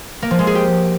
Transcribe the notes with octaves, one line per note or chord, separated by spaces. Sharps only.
A#3
F3
G#3
G#4
G4